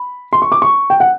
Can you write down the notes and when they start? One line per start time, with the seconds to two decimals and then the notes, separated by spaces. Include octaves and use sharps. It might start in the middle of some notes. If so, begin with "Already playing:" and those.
Already playing: B5
0.33 C6
0.42 C#6
0.52 D6
0.62 C#6
0.90 G5
1.00 F#5